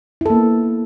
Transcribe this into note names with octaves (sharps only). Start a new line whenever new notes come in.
A#3 B3 E4 A4